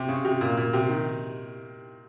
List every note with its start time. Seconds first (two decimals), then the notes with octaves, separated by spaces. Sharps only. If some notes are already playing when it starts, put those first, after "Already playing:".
Already playing: C3
0.09 C#3
0.25 C3
0.41 A#2
0.57 A#2
0.73 C3
0.89 D#3